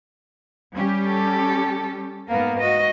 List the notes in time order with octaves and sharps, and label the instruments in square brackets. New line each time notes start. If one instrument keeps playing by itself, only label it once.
[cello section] G3 C#4 G4
[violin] A4
[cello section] G#2 A#4 [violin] A#3 B3
[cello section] F#4 [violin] D#5